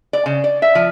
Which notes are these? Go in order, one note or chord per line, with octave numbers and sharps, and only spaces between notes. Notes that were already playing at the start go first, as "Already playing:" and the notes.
D5
C#3
D5
E5
F3